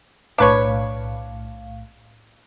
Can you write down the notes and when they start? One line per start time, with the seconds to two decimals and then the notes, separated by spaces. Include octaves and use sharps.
0.38 B1 A2 D4 B4 C#5 F5